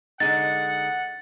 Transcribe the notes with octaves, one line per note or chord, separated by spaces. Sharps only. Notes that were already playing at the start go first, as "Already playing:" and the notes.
D3 G#3 D#4 F#5 A6